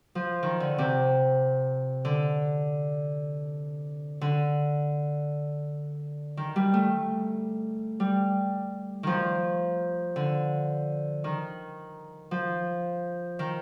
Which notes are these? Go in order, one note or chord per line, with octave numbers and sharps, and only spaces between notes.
F3
D#3
D3
C3
D3
D3
D#3
G3
A3
G3
D#3 F3
D3
D#3
F3
D#3